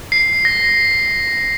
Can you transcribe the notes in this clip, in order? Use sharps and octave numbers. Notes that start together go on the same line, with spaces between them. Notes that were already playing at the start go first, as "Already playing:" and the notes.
C7
A#6